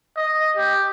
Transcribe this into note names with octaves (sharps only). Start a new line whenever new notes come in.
D#5
G4